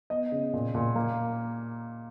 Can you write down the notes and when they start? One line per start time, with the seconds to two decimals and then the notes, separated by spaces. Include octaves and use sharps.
0.10 B3 D#5
0.32 C#3
0.53 A#2
0.75 A#2
0.95 A#3